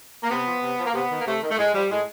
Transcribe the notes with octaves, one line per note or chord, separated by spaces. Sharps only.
A#3
C3 B3
F3
C3
F3
A#3
C3 B3
D#3
A#3
C3 A3
D#3
A3
A2 G#3
F3 G3
A2 G#3